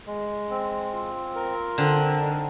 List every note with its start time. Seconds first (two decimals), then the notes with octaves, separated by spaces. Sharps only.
0.07 G#3
0.50 C4
0.93 F4
1.35 A#4
1.78 D3 C4
2.21 D#4